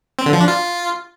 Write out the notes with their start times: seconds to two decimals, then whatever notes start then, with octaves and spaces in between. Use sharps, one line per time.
0.19 C4
0.26 D3
0.33 F3
0.40 D4
0.48 F4